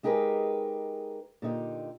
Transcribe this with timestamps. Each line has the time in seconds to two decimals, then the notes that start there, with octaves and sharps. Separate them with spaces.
0.03 G#3 D#4 G4 G#4 A#4 B4
1.42 A#2 D3 D#4 G4